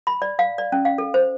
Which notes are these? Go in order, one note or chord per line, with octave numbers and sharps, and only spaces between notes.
B5
D5
F5
D5
C#4
F5
A4
C5